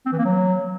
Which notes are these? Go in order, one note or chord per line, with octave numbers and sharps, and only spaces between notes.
C4
E3
A#3
F#3